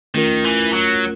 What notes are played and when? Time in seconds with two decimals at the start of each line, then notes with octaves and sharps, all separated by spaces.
0.15 D#3 A3 C#4 F4 A#4
0.44 E3
0.73 F#3